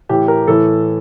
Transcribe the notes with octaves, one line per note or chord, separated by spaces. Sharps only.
A2 E3 G4
A#4
A2 E3 A4